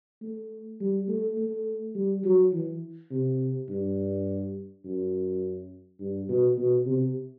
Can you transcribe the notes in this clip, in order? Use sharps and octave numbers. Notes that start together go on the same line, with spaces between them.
A3
G3
A3
A3
G3
F#3
E3
C3
G2
F#2
G2
B2
B2
C3